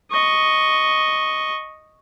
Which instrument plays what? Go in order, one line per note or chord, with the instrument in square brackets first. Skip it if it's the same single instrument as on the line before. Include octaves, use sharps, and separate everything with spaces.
[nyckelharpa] D#5 C#6